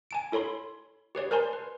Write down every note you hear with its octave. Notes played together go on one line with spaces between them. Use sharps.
G#5 A5 D7
E4 A4 C#5 B5 C6
G4 B4 C#5 D5
A#4 C5 D5 G#5 A5 C6
B4